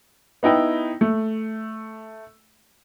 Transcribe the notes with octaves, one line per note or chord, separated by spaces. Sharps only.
B3 D#4 E4 G5
A3